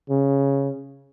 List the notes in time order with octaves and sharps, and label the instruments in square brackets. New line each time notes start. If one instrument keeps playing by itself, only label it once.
[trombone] C#3